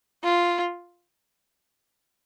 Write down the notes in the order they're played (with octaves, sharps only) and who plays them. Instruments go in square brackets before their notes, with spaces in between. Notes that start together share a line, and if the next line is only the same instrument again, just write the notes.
[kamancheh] F4